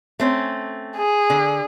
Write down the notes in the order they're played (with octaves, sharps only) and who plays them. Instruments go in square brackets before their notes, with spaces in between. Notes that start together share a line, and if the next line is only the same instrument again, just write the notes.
[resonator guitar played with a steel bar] A3 C4 C#4
[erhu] G#4
[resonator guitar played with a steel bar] D3